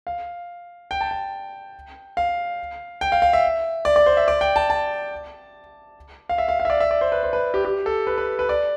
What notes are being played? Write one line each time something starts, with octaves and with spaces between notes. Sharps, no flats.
F5
G5
A5
G5
F5
G5
F5
F5
E5
D5
D5
C5
E5
D5
G5
A5
A5
F5
E5
F5
F5
E5
D5
E5
D5
C5
B4
C5
B4
G4
G4
A4
B4
B4
B4
D5